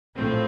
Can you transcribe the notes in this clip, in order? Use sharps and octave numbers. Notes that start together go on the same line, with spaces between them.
A#1 A2 F3 A3 C4